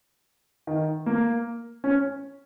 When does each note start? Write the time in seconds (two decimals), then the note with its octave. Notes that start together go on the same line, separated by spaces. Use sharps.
0.67 D#3
1.06 A#3
1.84 C#4